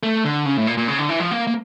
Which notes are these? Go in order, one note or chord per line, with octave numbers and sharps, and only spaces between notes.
A3
D3
C#3
A2
A#2
A#2
C#3
D3
E3
F3
A#3
A#3